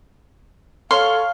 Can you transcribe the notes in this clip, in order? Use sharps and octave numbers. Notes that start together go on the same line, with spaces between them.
A4 C#5 F5 C6 C#6 F6